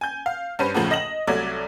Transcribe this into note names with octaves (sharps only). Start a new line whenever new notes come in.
G#5 G6
F5
G2 C#4 B4 C5 D#7
E2 A2 C#3 F3
D#5 A#6 E7 F#7
C2 F#3 A3 D5 G#6